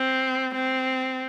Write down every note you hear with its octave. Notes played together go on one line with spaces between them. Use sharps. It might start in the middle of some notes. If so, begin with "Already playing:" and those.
Already playing: C4
C4